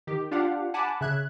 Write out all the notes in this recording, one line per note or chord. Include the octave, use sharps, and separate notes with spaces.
D#3 G4
D4 F4 G4 F5 F#5
F#5 G#5 A5 B5 D6
C#3 E5 F#6 G#6